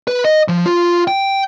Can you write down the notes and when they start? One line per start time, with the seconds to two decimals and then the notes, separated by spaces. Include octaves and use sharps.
0.08 B4
0.25 D#5
0.48 F3
0.66 F4
1.08 G5